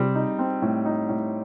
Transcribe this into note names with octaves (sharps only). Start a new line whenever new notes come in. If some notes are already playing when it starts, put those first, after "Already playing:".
Already playing: C3 G3 C4
D#4
C4
A2
D#4
A2